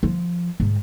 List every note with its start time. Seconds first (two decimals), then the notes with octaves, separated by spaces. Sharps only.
0.03 F3
0.60 G#2